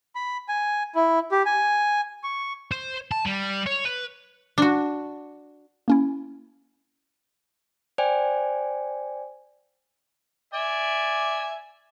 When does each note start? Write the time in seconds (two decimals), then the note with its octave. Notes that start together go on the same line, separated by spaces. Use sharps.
0.15 B5
0.48 G#5
0.95 E4
1.32 G4
1.46 G#5
2.24 C#6
2.72 C5
3.11 A5
3.26 G3
3.66 C#5
3.85 B4
4.58 D4 F#4
5.88 A#3 C#4 E4
7.98 C5 D5 G5 G#5
10.54 D5 E5 G#5